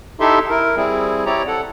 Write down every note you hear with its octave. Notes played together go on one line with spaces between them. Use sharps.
D#4 E4 G4 A4 E5 C6
E4 A#4
G3 C4 E4 G#4
C4 E4 G4 C#5 D5 A#5
A4 F#5